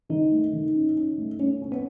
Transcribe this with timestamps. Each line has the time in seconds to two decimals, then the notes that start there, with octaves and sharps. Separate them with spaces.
0.09 D#3 D#4
0.31 A3
0.53 D#3
0.74 C#4
0.97 C#4
1.18 A3
1.39 A3 C#4
1.62 C#4
1.72 B3